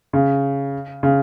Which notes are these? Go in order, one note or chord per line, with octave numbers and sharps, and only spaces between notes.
C#3
C#3